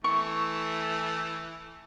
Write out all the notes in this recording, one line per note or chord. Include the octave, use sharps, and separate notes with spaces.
E3 A3 C#6